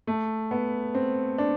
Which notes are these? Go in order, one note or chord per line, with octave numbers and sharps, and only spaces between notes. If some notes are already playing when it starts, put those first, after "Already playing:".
A3
B3
C4
D4